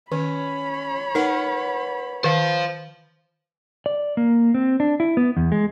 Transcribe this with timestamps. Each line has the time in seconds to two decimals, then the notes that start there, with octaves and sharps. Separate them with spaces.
0.12 D#3 C#4 C#5 B5
1.15 D#4 A#4 B4 F#5
2.24 D#3 C5 F5
3.86 D5
4.17 A#3
4.54 C4
4.80 D4
5.00 E4
5.17 B3
5.37 E2
5.52 G#3